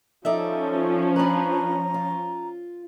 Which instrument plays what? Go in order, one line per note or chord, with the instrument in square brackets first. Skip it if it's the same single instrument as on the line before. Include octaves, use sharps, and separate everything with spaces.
[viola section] F3 C#4 [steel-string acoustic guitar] D#4 D5 E5 [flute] A4
[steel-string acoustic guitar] D4 B4 [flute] A#5
[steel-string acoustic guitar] F4